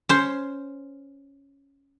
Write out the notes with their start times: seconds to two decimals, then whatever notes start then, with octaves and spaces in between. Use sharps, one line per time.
0.09 C#4 C5